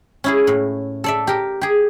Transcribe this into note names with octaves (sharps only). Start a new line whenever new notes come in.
C#4 E4 G#4
A2
A4 D5 E5
G4 A#4
G4 G#4